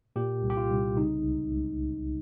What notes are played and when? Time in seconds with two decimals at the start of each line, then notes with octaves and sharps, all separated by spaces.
0.16 A#2 G4
0.43 C2
0.50 G4
0.57 F4
0.70 C2
0.97 C#3 D#4
1.24 C#2
1.51 C#2